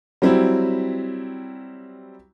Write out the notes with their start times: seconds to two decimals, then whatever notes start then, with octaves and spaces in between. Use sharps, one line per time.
0.22 F#3 G3 C4 E4